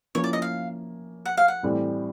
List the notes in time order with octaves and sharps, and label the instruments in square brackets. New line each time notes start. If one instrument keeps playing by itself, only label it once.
[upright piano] F3 A#3 C#4 E4 [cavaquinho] C#5
[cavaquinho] D5
D#5
F5
F#5
F5
F#5
[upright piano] A2 E3 G3 C4